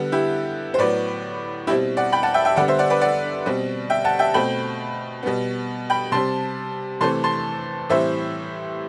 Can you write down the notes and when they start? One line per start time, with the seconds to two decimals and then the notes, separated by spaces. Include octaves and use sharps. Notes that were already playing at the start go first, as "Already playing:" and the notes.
Already playing: D3 G3 B3
0.12 E4 G4
0.74 C5
0.78 A2 F#3 B3 B4 D5
1.67 B2 G3 C4 E4 G4
1.97 D5 F#5
2.12 G5 B5
2.23 F#5 A5
2.34 E5 G5
2.45 E5 G5
2.56 D3 G3 B3 D5 F#5
2.68 C5 E5
2.79 D5 F#5
2.90 B4 D5
3.01 D5 F#5
3.46 B2 G3 C4
3.90 E5 G5
4.04 F#5 A5
4.19 E5 G5
4.34 B2 A3 C4 G5 B5
5.23 B2 G3 B3
5.90 G5 B5
6.12 C3 G3 C4 A5 C6
7.01 C3 E3 A3 C4 A5 C6
7.24 A5 C6
7.89 A2 E3 G3 C4 C5 E5